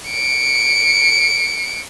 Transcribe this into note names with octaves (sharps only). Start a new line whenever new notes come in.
C#7 D7